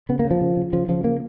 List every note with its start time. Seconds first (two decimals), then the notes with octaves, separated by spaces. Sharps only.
0.09 C#3 B3
0.19 A#3
0.25 C#3
0.31 F3
0.41 C#3
0.57 C#3
0.73 C#3 F3
0.88 C#3 F3
1.04 A#3